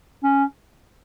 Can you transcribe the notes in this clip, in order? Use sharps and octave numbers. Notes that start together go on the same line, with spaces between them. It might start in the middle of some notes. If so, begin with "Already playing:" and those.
C#4